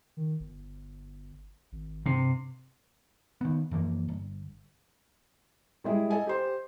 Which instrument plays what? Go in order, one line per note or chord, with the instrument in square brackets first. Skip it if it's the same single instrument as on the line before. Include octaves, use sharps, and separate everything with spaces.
[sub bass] D#3
G1
G#1
[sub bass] G2 [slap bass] C3
[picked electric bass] D#3 B3
F#2 E3 F3 A#3
G1
[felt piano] G3 G#3 E4 G#4
A4 D#5 G#5
G4 C5